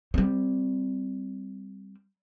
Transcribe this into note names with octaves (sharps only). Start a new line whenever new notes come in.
G3 C4